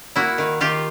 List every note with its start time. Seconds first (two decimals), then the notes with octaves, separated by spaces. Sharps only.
0.16 A#3 E4 F#4
0.38 D#3
0.61 D#3 F4 G4